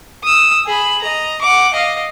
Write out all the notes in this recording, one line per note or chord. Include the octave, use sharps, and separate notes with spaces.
D#6 E6
G#4 B5
D#5 A#5
F#5 D6
D#5 F5